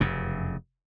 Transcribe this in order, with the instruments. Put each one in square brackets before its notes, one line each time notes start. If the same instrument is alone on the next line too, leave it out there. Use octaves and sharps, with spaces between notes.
[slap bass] F1 F#2 C#3